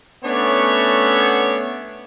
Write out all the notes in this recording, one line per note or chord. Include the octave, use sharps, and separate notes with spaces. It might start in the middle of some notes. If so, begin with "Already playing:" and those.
A3 B3 C#4 D4 C#5